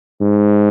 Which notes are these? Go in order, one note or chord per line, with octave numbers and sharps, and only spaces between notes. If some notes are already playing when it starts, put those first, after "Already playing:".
G#2